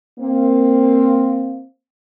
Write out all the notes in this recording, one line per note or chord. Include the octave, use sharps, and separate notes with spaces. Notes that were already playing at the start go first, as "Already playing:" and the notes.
A#3 C4